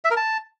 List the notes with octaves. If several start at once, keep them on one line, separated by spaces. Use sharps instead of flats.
E5
A#4
A5